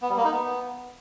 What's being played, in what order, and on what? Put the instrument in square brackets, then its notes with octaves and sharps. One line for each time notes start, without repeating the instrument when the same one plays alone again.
[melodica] B3
G3
A#3
D#4
B3